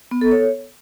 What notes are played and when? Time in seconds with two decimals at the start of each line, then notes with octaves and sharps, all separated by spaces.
0.11 B3
0.21 A4
0.32 C#5